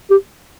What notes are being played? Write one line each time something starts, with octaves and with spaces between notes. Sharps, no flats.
G4